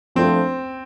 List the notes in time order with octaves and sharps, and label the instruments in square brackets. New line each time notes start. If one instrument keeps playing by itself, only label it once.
[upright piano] F3 A3 D4 F4 C5 [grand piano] C4